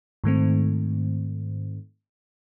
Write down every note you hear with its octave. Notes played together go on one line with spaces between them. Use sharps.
G#2 D#3 A3 C4